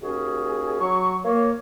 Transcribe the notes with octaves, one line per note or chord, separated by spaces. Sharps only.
D#2 C#4 F#4 G#4
F#3 C#6
A#3 C#5